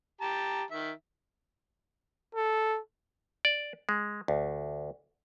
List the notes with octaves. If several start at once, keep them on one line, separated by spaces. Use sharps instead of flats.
G4 A5 A#5
D#3 E5
A4
D5
G#3
D2